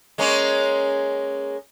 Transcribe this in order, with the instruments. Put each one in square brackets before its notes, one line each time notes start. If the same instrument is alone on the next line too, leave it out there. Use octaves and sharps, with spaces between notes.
[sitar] G#3 A#3 C#4